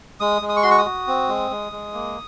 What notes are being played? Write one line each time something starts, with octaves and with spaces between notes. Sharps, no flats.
G#3 D#6
G#3
D#6
C#6
F#4 C6
C#6
D#6
F#4
C4
G#3
G#3
G#3
A#3